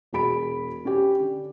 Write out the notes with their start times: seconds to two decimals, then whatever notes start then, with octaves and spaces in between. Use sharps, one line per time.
0.13 E1 F#4 G#4 B5 D7
0.85 C#4 G4
1.20 D3